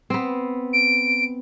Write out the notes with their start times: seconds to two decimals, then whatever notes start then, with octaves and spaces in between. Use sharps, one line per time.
0.10 B3 C4
0.73 D7